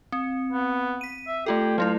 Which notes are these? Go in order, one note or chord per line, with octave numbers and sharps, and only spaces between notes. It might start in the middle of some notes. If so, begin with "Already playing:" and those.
C4
B3
B6 D#7
E5
A3 F4 G4 A4
F#3 A3 E4 F4